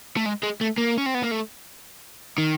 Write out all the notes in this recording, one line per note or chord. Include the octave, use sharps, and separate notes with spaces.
A3
G#3
G#3
A3
A#3
C#4
C4
B3
A#3
A3
D#3